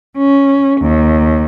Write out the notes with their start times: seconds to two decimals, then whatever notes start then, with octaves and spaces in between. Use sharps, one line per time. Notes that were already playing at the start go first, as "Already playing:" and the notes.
0.18 C#4
0.81 D#2